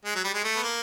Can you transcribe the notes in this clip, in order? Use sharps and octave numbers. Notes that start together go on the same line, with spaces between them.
G#3
F#3
G3
G#3
A3
B3
A#3